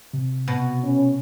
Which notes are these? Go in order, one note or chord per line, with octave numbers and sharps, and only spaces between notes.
C3
B2
C#4